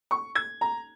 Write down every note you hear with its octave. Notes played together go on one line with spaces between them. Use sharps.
C#6
G#6
A#5